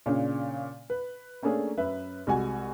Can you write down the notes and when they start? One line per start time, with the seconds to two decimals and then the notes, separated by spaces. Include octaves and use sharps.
0.06 A#2 C#3 C#4 D4
0.90 B4
1.42 A3 A#3 C#4 D4 G#4
1.77 F#2 B4 E5
2.27 C2 G#3 F#4 G#5